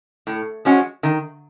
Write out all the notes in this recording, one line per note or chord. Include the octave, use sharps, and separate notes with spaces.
A2
F3 G#3 C#4 F#4
D#3